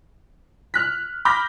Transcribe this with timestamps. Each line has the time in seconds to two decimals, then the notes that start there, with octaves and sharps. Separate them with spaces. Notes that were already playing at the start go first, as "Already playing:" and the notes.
0.74 F6 F#6 B6
1.25 B5 D6 F6 G6 A#6 B6